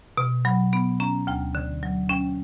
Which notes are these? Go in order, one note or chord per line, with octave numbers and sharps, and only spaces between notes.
B2
F#3 B5
B3 B5
C#4 A#5
D2 G5
D3
F#3
C#4 G5